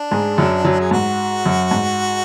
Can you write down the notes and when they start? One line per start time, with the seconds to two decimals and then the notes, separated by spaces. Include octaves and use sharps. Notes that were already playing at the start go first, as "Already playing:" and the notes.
Already playing: D4
0.11 G#2 G#3
0.38 F#2 F#3
0.65 F#2 F#3
0.81 G#4
0.91 G#2 F#4
1.46 F#2
1.71 G#2